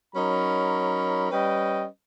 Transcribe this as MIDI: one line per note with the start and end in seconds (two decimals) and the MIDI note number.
0.15 1.29 54
0.15 1.29 61
0.15 1.29 63
0.15 1.29 70
0.15 1.29 83
1.32 1.86 55
1.32 1.86 61
1.32 1.86 71
1.32 1.86 75
1.32 1.86 79